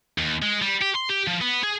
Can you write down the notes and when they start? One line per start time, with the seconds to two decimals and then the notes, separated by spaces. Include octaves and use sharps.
0.18 D#2
0.42 G#3
0.62 G3
0.82 G4
0.95 C6
1.10 G4
1.27 F3
1.41 B3
1.63 G#4